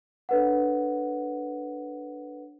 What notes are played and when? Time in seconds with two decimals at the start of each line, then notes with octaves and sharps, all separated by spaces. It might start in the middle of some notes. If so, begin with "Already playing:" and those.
0.29 D4 A4 B4 C#5 F#5